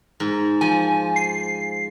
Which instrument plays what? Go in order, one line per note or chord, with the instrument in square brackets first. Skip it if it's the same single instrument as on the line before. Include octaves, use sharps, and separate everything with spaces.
[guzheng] G#2
[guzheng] F3 [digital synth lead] G#5
[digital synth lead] C7